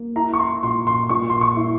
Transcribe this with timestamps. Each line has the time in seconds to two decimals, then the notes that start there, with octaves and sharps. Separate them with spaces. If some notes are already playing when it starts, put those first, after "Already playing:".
Already playing: A#3
0.16 E4 A#5
0.34 C#6
0.39 C6
0.63 A#2 C6
0.87 C6
1.09 A#2 C#6
1.30 C6
1.41 C#6
1.57 E4